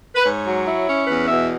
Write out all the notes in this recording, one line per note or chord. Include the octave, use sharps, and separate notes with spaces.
B4
G#2 C#5
F#3
E4
C#4
E2 B4
B2 E5